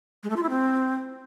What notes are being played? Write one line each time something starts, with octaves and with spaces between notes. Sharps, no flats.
G#3
A3
F4
E4
C4